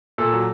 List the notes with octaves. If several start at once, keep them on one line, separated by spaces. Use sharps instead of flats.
A#2 A4
F#3